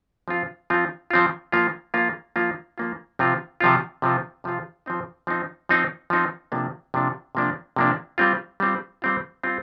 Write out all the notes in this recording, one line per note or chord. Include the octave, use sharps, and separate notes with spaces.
F3 C4 F4
F3 C4 F4
F3 C4 F4
F3 A#3 F4
F3 A#3 F4
F3 A#3 F4
F3 A#3 F4
C3 F3 C4 F4
C3 F3 C4 F4
C3 F3 C4 F4
C3 F3 C4 F4
F3 C4 D#4
F3 C4 D#4
F3 C4 D#4
F3 C4 D#4
C3 F3 A#3 D4
C3 F3 A#3 D4
C3 F3 A#3 D4
C3 F3 A#3 D4
G3 C4 F4
G3 C4 F4
G3 C4 F4
G3 C4 F4